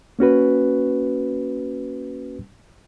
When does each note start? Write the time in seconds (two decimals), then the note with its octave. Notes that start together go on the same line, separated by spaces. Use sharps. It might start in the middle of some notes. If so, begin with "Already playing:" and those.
0.19 A#3 C#4 F#4 B4